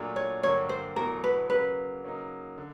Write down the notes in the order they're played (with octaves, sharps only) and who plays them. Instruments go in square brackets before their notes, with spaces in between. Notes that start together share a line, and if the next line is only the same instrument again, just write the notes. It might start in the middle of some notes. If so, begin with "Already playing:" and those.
Already playing: [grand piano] A#2 F#3 A3 D4
[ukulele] C#5
[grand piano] G2 D3 F#3 A#3 [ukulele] C#5
[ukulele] C5
[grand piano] E2 B2 F#3 A3 [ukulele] A#4
[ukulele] B4
[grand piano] C#3 F#3 A#3 [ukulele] B4
[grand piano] C#3 F#3 A#3 D#4
D3